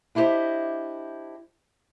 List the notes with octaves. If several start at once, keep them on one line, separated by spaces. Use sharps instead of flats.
D4 E4 G4 G#4 C5 D#5